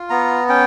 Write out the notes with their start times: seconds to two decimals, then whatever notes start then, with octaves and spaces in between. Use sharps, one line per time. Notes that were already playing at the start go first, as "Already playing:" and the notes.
Already playing: F4
0.10 B3 A#5
0.49 C#4 G5